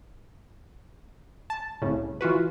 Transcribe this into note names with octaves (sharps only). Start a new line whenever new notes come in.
A5
C2 A2 C#3
E3 F4 F#4 B4